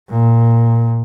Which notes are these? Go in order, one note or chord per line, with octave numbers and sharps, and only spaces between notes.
A#2